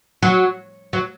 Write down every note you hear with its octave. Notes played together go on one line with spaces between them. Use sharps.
F#3
F#3